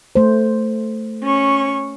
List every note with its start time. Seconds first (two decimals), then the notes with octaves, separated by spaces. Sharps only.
0.15 A3 C5
1.23 C#4 C#6